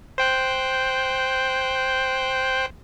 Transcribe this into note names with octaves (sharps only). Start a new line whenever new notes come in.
C5 G5 F#6